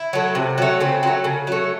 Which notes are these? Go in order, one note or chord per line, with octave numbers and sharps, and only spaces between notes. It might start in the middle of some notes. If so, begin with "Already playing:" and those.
Already playing: E4
F#3 A3
C3
F#3 A3
C#3 C4
F#3 A3
C#3
F#3 A3